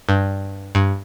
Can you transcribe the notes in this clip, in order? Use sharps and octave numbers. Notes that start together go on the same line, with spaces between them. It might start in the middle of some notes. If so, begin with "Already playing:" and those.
G2
G2